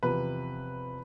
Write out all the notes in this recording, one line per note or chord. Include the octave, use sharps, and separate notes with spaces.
E2 C3 F3 B4